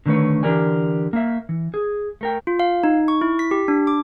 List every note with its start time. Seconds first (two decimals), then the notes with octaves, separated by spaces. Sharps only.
0.06 D3 D#3 F#3 A3 B4 C#5
0.43 D3 E3 G4 A#4 D5 G#5
1.13 A#3 E5
1.49 E3
1.74 G#4
2.21 A3 A#4 G5
2.47 F4
2.60 F5
2.84 D#4
3.08 C#6
3.21 E4
3.39 B6
3.51 G4
3.68 D4
3.87 D6